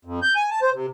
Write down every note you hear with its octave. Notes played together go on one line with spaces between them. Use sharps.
F2
G6
G#5
A5
C5
C3